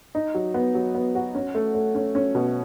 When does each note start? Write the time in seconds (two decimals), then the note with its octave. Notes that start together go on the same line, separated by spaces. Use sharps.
0.15 D#4
0.35 F#3
0.54 B3
0.74 F#3
0.95 B3
1.15 F#4
1.35 C#4
1.55 A3
1.75 A3
1.95 C#4
2.15 C#4
2.35 B2